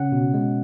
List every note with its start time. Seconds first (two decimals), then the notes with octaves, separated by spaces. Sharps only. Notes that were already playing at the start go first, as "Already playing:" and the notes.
Already playing: C#3 C#4 F#5
0.12 B2
0.34 G#3